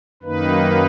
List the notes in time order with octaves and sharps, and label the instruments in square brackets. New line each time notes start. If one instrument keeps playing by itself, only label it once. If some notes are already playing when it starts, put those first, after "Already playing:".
[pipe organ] F#2 D#3 A#3 D#4 B4